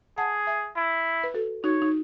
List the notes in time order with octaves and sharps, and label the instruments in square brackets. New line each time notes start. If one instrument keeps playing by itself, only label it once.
[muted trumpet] G#4 [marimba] F#5 A5
[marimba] E5 G#5
[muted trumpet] E4
[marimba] B4
F#4 A4
[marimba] D#4 F#4 [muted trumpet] C#5
[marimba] D#4